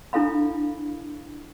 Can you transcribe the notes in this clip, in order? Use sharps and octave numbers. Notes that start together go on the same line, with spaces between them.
D4 E4 A4 F5 B5